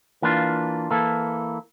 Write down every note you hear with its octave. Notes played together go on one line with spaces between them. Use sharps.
E3 A#3 D4 F4
E3 A#3 E4 A4